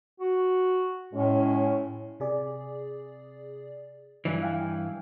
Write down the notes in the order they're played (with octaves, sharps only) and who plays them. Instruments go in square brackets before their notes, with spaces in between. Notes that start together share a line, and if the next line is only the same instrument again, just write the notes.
[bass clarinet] F#4
[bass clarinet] A2 [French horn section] G#3 C#4
[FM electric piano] C3 G#4 D5
[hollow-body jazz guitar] G2 E3
[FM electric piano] F5 G5 G#5